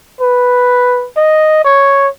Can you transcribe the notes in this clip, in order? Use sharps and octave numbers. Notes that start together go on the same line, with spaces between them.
B4
D#5
C#5